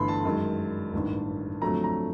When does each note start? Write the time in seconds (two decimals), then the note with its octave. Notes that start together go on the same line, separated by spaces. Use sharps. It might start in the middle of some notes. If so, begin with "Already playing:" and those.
Already playing: G1 G2 E3 A3 B5 C6
0.08 A5
0.25 F#2 D#3 G#3
0.93 A1 G2 D#3
1.61 F2 D3 F#3 A3 A#5
1.84 A#5